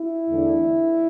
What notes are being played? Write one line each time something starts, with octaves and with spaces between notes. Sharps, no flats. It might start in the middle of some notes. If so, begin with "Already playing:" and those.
Already playing: E4
E2 D3 A3 D4